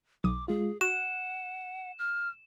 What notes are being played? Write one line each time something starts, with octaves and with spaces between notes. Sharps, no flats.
B1 D6 D#6
G#3 F4 G#4
F#4 F#5 F#6 E7
F6